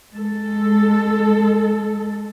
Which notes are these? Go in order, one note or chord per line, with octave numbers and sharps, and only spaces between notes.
G#3 A4